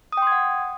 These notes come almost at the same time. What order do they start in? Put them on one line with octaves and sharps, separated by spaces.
D#6 G5 C6 G#6 F#5